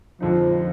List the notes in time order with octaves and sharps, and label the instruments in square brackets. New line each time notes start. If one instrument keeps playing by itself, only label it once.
[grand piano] F2 D3 G#3 D#4 [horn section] F3